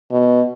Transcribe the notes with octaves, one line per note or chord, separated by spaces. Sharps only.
B2